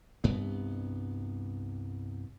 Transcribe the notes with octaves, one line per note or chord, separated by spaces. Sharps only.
C2 G2 B3